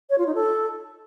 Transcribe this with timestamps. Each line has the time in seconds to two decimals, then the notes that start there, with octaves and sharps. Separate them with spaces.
0.10 C#5
0.18 F4
0.26 D#4
0.34 A4